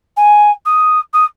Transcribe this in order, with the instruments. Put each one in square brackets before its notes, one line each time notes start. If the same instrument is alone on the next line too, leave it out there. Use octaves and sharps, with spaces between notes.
[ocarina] G#5
D#6
D#6